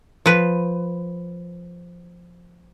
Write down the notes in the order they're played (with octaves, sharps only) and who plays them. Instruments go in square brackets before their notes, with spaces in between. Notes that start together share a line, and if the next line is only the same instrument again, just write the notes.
[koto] F3 B4